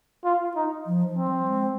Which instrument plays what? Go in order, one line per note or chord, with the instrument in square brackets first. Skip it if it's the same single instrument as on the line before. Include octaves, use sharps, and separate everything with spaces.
[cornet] F4
D#4
[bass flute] F3
F3
[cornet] C4
[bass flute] G3
G#3